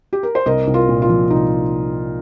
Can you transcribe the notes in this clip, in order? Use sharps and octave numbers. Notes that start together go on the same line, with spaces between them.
G4
A#4
C5
C2 A#4 D#5
C2
F4 A#4
A#2
F4
F3
C2 D#4